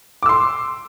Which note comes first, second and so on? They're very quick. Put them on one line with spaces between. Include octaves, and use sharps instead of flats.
D6 E6 C6